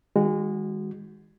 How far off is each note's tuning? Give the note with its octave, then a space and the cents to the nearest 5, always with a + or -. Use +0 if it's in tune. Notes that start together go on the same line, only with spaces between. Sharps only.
D#3 +35 G#3 -25 F#4 +0